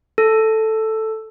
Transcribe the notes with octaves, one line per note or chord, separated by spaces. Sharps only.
A4